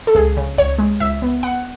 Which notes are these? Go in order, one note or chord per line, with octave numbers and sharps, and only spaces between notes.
A4
C#2 G#4
C#3
C#2 C#5
G#3
C#2 E5
B3
B3 F#5